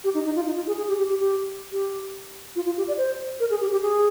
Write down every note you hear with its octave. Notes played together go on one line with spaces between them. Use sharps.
G4
D#4
D#4
F4
D#4
F4
G#4
G#4
G4
G4
G4
G4
G4
F4
F4
G4
D5
C5
A#4
G#4
G4
G4
G#4